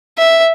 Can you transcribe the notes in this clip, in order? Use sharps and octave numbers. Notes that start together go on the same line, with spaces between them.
E5